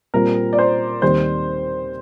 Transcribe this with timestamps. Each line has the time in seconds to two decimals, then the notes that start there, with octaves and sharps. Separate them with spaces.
0.14 A#2 G3 C4 A#4
0.53 D5
0.59 C5
1.02 D#2 D#3 G3 C4 G4 C5